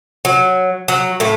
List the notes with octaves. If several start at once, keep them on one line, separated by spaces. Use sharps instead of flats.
F#3
F#3
A2 A3